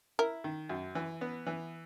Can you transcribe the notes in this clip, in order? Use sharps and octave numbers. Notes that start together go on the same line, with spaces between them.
E4 A#4
D#3
F#2
E3
B3
E3